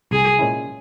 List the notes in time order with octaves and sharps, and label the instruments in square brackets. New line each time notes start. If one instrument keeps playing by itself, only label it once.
[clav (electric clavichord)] C2 [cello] G#4
[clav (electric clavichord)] A#2 G#3 C#4 E4